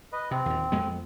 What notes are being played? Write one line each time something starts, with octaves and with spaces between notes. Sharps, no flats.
B4 D#5
C3 C4
D#2 A#2
F2 G#3 B3